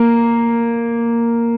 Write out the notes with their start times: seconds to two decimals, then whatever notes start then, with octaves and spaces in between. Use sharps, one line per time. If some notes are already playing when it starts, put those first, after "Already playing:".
Already playing: A#3